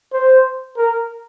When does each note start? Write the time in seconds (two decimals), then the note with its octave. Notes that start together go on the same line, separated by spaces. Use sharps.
0.13 C5
0.77 A#4